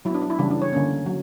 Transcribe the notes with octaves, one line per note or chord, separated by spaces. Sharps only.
F#3 E4
B3 D4
D4
E4
C#3 E3 G3 D4
D4
C#5
D3 A#3 C#4
F#3